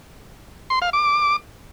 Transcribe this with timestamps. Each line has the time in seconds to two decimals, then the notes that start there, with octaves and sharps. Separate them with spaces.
0.70 C6
0.82 F5
0.93 D6